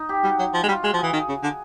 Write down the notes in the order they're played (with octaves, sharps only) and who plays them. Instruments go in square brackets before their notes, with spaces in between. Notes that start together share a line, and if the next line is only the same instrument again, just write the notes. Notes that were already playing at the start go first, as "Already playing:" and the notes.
Already playing: [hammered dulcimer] D#4
G4
[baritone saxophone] G3 [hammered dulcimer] F#4
[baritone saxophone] F#3
F3
G#3
G3
[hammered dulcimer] F4
[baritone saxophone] G#3 [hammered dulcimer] F#4
[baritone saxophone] F3
[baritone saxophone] E3 [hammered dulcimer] G#4
[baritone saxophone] D#3 [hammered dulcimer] G#4
[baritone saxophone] C#3
D3